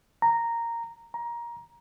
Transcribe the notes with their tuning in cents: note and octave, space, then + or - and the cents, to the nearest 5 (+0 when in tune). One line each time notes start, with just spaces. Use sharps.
A#5 -10
A#5 +15